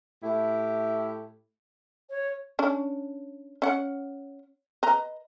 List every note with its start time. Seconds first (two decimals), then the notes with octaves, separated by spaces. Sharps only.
0.23 A2 A3 E4 G4
2.09 C#5
2.59 C#4 D4
3.62 C#4 F#5
4.83 B4 D#5 A#5